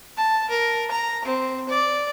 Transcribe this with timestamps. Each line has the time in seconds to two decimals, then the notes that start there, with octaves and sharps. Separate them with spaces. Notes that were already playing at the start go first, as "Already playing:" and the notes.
0.16 A5
0.50 A#4
0.91 A#5
1.25 C4
1.69 D5